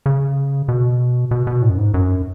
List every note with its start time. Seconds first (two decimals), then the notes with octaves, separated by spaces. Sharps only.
0.06 C#3
0.68 B2
1.31 B2
1.47 B2
1.62 A2
1.70 F#2
1.78 G#2
1.94 F#2